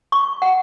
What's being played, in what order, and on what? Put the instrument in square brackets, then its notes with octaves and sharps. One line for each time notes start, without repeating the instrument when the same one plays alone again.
[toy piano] C#6
F#5